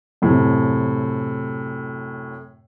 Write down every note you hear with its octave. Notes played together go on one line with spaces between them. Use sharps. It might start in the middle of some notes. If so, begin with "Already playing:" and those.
F#2 A2 C3